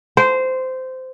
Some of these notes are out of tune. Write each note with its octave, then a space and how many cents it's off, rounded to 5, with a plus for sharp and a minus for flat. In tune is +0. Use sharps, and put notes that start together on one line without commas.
C5 -15